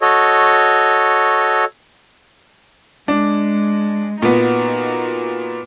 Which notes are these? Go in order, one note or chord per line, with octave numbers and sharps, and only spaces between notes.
F#4 A4 C#5 D#5
G#3 D4
A#2 B3 D#4 F#4